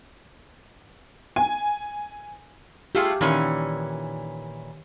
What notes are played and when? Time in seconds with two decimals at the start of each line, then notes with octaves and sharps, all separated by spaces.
1.36 G#5
2.95 A3 F4 G4 G#4
3.21 A#2 D#3 E3 C#4